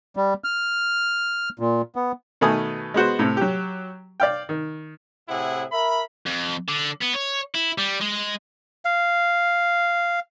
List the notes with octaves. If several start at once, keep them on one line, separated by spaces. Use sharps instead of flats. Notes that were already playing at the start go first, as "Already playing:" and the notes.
G3
F6
A#2
B3
B2 D#3 A3 B4 G#5 D#6
G#3 B3 F#4 C5
A2 C3
F#3 G4
D5 F5 G5
D#3
A2 C3 E4 G#4 F#5
A#4 E5 B5
F2
D3
B3
C#5
E4
G3
G#3
F5